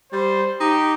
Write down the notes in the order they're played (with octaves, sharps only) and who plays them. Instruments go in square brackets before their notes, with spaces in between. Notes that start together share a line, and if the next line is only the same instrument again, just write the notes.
[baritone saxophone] G3 [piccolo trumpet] C5
[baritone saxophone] D#4 [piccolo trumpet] G4